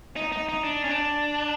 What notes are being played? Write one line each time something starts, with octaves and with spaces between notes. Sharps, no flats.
D#4
D#4
D#4
D4
C#4
D4